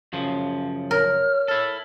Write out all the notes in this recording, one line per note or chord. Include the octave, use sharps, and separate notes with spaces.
F#2 C#3 F3
A#4 C#5 F6
E4 A4 F6